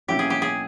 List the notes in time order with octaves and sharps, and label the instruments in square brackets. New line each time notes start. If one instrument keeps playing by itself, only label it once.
[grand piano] B2 F#3 A#3 C#4 E4 [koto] G4
[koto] G#4
G4
G#4